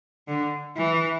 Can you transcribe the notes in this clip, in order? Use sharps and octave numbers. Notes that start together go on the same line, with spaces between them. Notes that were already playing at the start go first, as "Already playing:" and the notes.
D3
E3